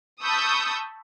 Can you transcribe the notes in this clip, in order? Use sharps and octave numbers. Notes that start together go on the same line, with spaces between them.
A5 B5 C#6 D#6 E6 G6